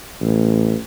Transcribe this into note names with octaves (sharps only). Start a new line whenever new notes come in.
A1